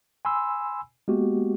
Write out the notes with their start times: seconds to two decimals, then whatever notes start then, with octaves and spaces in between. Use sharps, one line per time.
0.25 G#5 B5 C6 E6
1.08 G#3 A#3 B3 F#4 G4